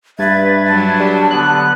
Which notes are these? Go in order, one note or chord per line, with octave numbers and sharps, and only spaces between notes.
G2 B4 E5 G#6 A6
F#3 D4 A5
G3
D3 B3 F#6